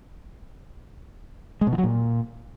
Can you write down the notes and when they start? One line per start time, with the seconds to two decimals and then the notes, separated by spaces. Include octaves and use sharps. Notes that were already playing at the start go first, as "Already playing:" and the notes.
1.61 G#3
1.67 B2
1.73 E3
1.78 F#3
1.84 A#2